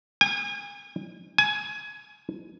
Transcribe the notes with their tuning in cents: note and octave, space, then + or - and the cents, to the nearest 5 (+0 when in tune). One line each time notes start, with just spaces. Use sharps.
G#5 -35
G#5 +20